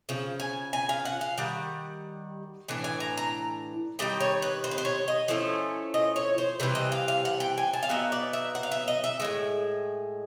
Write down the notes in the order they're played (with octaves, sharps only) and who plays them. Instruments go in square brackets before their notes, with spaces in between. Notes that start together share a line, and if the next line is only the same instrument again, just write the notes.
[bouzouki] C#3 F3
G#5
G#5
F5
F#5
F5
D#3 G3 F#5
A2 E3 D4
G#5
A#5
A#5
D#3 G3 D#4 G5
C#5
B4
C5
B4
C5
C#5
D#5
F3 A3 C#4 E4
D#5
C#5
C5
C3 E3 G3 B4
D#5
F5
F5
F#5
G5
G#5
A5
F5
F#3 B3 D#4 E5
D5
E5
F#5
F5
E5
D#5
E5
E3 G#3
A2